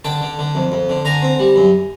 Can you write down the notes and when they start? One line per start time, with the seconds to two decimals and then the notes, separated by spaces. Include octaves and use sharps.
0.04 D3 G5 A5
0.22 D3
0.39 D3
0.55 F2
0.72 F2
0.89 D3
1.05 D3 G#5 A#5
1.22 C4
1.39 G3
1.56 F#2